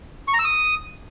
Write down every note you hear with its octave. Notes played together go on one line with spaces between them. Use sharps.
C#6
A#5
E6
D#6